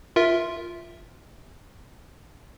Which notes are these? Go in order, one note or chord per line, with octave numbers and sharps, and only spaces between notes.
F4 A#4 E5